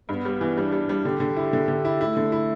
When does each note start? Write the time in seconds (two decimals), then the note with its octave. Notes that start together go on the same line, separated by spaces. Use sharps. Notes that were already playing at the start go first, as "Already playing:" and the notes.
0.09 G2 B3
0.25 G3
0.41 E3
0.56 G3 D4
0.72 G3
0.89 G3
1.05 D3 G4
1.20 D3
1.36 E4
1.53 D3
1.68 D3
1.85 E4
2.00 A3 E4
2.17 D3
2.32 E4